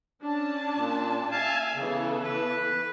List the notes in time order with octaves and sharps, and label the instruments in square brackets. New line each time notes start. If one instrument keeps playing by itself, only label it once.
[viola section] C#4 D4 A5
[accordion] A#2
[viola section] E5 G#5 [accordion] F5 A5
[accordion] C#3 [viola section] E3 B3 A4
[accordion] B4